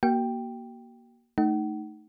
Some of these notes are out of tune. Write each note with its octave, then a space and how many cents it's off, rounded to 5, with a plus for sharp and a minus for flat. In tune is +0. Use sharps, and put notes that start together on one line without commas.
A#3 +20 F#4 +35 G5 +5
A3 +0 D#4 +0 F#5 +45